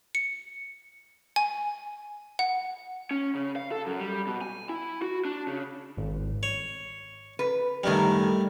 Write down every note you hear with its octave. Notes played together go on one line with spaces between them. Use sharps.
C#7
G#5
F#5
C#4
C#3
F5
A4
F#2
G3
B2
G#5
E4
F#4
D4
C#3
G#1
C#5
B4
F#2 A2 D#3 G3 A3